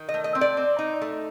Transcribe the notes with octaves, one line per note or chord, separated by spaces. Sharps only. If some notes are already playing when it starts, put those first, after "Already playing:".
Already playing: D#3
D#5
A3
D#5
C4
D5
C4
D#4
A3